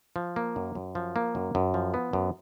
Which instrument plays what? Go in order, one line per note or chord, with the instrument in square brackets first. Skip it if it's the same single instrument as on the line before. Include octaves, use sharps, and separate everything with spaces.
[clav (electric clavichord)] F3
A#3
F#2
F#2
F3
A#3
F#2
F#2
F3
B3
F#2